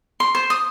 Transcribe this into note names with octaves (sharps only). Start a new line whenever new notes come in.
C6
C5
D#6